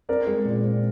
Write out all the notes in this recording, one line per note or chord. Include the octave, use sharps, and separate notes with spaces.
C4 A#4 D5
G#3
A#2
C4